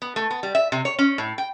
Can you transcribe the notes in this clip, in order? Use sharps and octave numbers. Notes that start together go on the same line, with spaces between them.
B3
A3
B3
G3
E5
C3
C#5
C#4
A2
G5